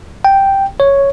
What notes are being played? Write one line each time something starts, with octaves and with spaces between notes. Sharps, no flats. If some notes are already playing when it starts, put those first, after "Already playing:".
G5
C#5